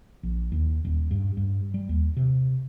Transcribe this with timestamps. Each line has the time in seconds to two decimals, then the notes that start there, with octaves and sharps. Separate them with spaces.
0.23 A#1
0.52 D#2
0.85 D#1
1.11 G2
1.37 G2
1.74 G3
1.89 D#2
2.17 C3